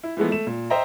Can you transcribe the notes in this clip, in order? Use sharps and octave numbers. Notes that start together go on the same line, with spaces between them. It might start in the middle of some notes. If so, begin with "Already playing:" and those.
E4
E3 F3 G#3 A3 B3
A3 E7
A#2
C5 D#5 E5 G5 A#5